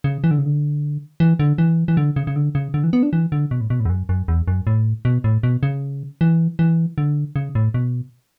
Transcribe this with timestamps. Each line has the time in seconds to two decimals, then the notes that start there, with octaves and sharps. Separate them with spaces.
0.04 C#3
0.24 E3
0.31 D3
0.38 C#3
0.46 D3
1.20 E3
1.39 D3
1.58 E3
1.88 E3
1.97 D3
2.16 C#3
2.27 C#3
2.36 D3
2.55 C#3
2.74 D3
2.84 E3
2.93 B3
3.03 D4
3.13 E3
3.32 D3
3.51 B2
3.61 A2
3.70 B2
3.80 A2
3.85 E2
3.90 F#2
4.09 F#2
4.28 E2
4.48 F#2
4.67 A2
5.05 B2
5.24 A2
5.43 B2
5.63 C#3
6.21 E3
6.59 E3
6.98 D3
7.36 C#3
7.55 A2
7.74 B2